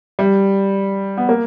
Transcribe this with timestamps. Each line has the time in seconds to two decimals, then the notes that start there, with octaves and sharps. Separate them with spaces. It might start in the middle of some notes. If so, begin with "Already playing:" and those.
0.19 G3
1.17 B3
1.29 A#3